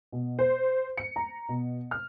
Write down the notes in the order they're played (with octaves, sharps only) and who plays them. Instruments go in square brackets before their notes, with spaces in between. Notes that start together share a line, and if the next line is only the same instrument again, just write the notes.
[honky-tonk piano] B2
C5
C#7
A#5
B2
F6